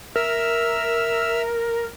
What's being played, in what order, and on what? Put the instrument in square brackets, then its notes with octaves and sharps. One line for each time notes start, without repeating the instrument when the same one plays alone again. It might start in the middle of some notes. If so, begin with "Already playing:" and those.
[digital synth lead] A#4 [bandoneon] E5 E6 F6